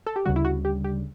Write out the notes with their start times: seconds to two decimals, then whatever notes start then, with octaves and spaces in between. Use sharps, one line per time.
0.07 A4
0.16 G4
0.25 D2 C#3 G3 F#4
0.36 E4
0.45 F#4
0.65 G4
0.84 G4